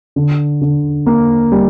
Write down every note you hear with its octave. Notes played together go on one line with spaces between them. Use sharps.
D3
D3
A#3
G3